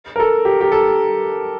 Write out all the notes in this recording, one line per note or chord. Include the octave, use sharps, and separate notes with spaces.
A#4
A4
G4
G4
A4